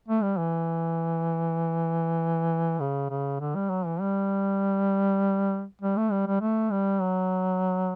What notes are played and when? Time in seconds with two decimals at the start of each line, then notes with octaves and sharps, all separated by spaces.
0.08 A3
0.23 G3
0.38 E3
2.80 C#3
3.10 C#3
3.40 D3
3.56 G3
3.70 F#3
3.86 E3
4.01 G3
5.82 G3
5.97 A3
6.11 G3
6.27 G3
6.41 A3
6.71 G3
7.02 F#3